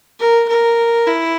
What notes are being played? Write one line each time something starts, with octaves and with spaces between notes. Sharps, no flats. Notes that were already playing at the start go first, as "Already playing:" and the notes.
A#4
A#4
E4